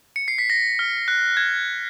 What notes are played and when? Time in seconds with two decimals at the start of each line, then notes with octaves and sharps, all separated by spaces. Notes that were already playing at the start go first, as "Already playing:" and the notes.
0.16 C#7
0.28 C7
0.38 B6
0.50 A#6
0.79 F6
1.08 F#6
1.37 G#6